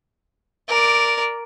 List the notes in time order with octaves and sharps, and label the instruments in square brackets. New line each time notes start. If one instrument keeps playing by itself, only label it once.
[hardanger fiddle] A#4 D5